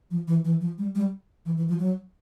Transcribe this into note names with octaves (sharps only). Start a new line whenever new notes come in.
F3
E3
E3
F3
G3
G3
E3
E3
F3
F#3